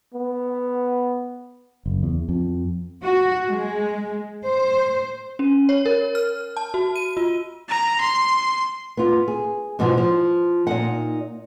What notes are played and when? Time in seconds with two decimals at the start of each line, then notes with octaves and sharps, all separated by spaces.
0.14 B3
1.86 F#1
2.03 E2
2.29 F2
3.03 F#4
3.49 G#3
4.45 C5
5.39 C#4
5.69 C#5
5.86 A#4
6.15 F6
6.57 A5
6.74 F#4
6.96 D#7
7.17 F4
7.69 A#5
8.01 C6
8.97 B3 F4
9.28 G#4
9.79 G#2 B2 E3 F3
9.97 F3
10.67 A#2 D#4 F#5